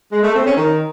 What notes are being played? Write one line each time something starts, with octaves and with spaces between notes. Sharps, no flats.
G#3
A3
C4
C#4
D#3